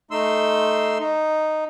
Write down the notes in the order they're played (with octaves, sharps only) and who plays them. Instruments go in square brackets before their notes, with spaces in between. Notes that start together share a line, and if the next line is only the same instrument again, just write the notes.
[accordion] A3 D#4 C6 E6
D#4